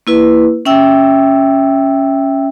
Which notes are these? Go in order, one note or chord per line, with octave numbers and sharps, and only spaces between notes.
A#3 E4 B4
C#4 E5 G5 E6